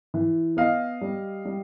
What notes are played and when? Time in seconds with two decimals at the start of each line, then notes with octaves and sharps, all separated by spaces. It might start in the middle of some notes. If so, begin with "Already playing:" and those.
0.14 E3
0.57 B3 D#5 F5
1.01 G3
1.45 G3